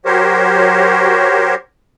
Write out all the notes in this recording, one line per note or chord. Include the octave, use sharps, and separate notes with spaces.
F#3 F#4 G4 A#4 C5 C#5